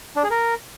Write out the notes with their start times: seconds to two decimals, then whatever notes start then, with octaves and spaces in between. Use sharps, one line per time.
0.16 D4
0.23 G#4
0.31 A#4